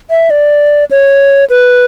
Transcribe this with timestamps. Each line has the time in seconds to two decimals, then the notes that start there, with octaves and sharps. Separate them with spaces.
0.10 E5
0.30 D5
0.91 C#5
1.50 B4